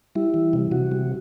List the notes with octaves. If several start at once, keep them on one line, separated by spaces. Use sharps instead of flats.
G3 E4
E3
C3
C3 F#4
G3